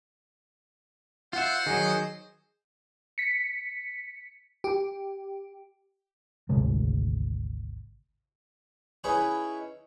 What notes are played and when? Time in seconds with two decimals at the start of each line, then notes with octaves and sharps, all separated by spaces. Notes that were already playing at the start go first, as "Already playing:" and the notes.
1.33 F4 C5 E5 F#5
1.66 D#3 F#3 G#4 D#5
3.18 B6 C#7
4.64 G4
6.49 G#1 D2 C3 G#3
9.04 C#4 D#4 E4 G#4 B4 C#5